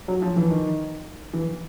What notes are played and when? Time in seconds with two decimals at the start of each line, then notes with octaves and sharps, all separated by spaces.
0.08 F#3
0.22 F3
0.36 E3
0.50 D#3
1.33 E3